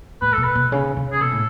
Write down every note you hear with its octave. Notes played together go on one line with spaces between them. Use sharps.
A2 B4
B2 A4
B4
B2
C#3
C#3
G#4
B2 A4
A2